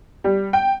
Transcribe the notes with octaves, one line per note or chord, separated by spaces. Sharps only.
G3
G5